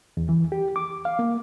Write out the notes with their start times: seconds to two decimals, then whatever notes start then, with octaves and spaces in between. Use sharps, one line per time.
0.17 E2
0.29 E3
0.52 G4
0.76 D6
1.05 F5
1.19 A#3